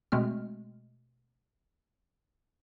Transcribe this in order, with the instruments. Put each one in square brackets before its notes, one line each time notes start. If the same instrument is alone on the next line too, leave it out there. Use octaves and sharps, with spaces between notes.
[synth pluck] B2 G#3 A3 C4 F6